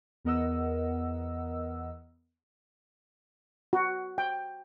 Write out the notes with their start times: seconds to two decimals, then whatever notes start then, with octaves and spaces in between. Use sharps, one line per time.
0.25 E2 B3 A#4 D#5 F#5 E6
3.73 F#4
4.18 G5